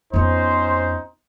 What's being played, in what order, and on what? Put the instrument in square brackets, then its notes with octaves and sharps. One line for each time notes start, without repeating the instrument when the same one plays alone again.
[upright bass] F2 B3 [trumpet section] C#4 D#4 C5